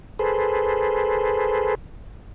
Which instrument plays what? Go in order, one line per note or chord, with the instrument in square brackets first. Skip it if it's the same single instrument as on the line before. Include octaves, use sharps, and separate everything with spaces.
[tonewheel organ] G#4 A4 B4 C5